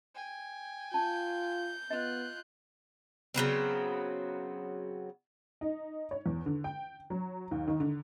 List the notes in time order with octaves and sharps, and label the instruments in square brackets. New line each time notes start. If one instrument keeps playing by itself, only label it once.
[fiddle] G5 G#5
[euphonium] F4 [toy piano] A5 [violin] G6
[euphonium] B3 [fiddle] F4 F#6 [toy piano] D#5
[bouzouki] C#3 F#3 B3 C4
[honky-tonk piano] D#4
C#5
E2
D3
G5
F#3
D#2
D#3
D3